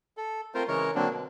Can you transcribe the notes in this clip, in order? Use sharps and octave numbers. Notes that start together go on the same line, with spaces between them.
A4
A3 C4 F4 A#4 C5
C#3 E3 G#3 A#4 C#5
D3 F#3 A#3 C4 D4
B2